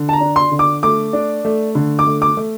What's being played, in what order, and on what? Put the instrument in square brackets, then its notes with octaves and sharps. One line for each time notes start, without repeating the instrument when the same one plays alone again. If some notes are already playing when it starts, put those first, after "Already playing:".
Already playing: [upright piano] D3
A5
A#5
D4
C6
D3
D6
A3 D6
D4
A3
D3
D6
A3
D6
A3